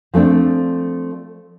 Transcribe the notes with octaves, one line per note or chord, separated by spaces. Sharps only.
F3 A3 C4 D4